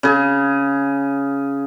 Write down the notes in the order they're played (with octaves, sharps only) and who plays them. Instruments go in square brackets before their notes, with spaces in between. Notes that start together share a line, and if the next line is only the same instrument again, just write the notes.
[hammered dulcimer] C#3 G#4